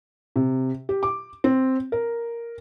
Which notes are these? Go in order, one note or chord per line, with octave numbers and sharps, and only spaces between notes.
C3
G4
D6
C4
A#4